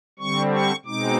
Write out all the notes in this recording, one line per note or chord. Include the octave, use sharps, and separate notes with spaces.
D3 G3 C4 C#6
C#6
B2 G#3 C4 D#4 D6